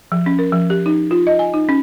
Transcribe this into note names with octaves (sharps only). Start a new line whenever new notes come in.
F3
C#4
A#4
F3
G4
D#4
F4
D#5
G#5
D#4
C#4